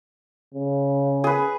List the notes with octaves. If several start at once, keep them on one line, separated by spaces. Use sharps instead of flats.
C#3
G#4 B4